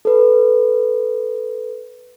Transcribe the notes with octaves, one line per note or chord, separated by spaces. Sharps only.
A4 B4